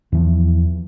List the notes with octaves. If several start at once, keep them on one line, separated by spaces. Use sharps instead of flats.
E2 E3 F3